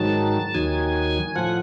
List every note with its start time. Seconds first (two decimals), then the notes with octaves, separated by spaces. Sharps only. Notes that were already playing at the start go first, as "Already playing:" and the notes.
Already playing: G#2 D#3 F#3 A5
0.54 D#2 D#3 F#3 G#5
1.35 A2 F3 F#5